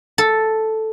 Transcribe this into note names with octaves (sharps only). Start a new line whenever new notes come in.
A4